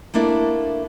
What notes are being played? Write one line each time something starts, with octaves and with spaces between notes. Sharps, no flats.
A3 A#3 D4 E4